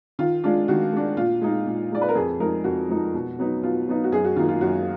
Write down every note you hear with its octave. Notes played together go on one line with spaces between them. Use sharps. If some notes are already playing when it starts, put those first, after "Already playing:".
D#3 F4
G#3 D4 F4
D#3 F#4
G#3 D4
A#2 F4
G#3 D#4
A#2
G#3 D#4 D5
B4
A#4
F2 G#4
F3 G#3 D#4 A#4
F2 F#4
F3 G#3 D#4
B2
F#3 B3 D#4
B2 F4
F#3 B3 D#4
F#4
F#2 G#4
F#4
D#3 A#3 D#4 F4
F4
F#2 F#4